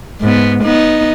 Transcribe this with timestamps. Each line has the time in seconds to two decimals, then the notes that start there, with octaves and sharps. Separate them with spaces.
0.21 G#2 B3
0.64 B3 D#4